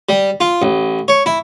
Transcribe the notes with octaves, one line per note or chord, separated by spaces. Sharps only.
G3
F4
A1
C#5
E4